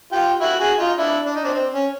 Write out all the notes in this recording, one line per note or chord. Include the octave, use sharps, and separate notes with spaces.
F4 G4
E4 F#4
F#4 G#4
D#4 F4
D4 E4
D4
D#4
C4 D4
C4
C#4